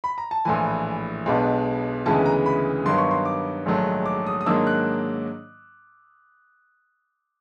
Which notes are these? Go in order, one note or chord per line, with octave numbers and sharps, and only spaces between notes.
B5
A#5
A5
A#1 A2 E3 G#5
B1 B2 G#3 B3 D4
D2 C#3 E3 G#3 B3 A5
A#5
B5
G2 D#3 F#3 B3 C6
C#6
C6
D6
A#1 G#2 D#3 F#3 A3
D6
D#6
D#6
G#2 D#3 F#3 A#3 D4 E6
F#6